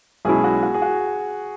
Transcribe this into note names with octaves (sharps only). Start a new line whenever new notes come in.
B1 B2 G#3 C#4 E4 G#4
F#4
F#4
G#4
F#4